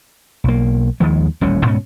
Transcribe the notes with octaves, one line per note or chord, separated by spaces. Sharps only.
B1 A#3
D#2 D#3 F3 G#3
D#1 A1 G3 C#4
D2 G#2 B2 C#4